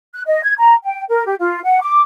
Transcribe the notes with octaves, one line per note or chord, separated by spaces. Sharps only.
F#6
D#5
G#6
A#5
G5
A#4
G4
F4
F#5
D6